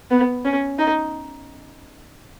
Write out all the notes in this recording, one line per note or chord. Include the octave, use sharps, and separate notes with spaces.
B3
C#4
D#4